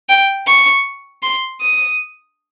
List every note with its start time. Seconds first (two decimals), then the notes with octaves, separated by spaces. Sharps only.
0.09 G5
0.47 C#6
1.23 C6
1.61 D#6